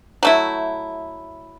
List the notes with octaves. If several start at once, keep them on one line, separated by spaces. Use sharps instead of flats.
F#3 A3 E4